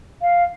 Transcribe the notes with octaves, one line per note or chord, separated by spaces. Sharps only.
F5